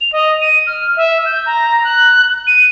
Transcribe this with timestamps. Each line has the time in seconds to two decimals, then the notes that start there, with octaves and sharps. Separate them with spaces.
0.01 F7
0.13 D#5
0.41 D#7
0.67 F6
0.97 E5
1.26 G6
1.46 A#5
1.84 F#6
2.47 D#7